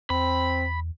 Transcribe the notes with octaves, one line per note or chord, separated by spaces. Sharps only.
E2 C4 B5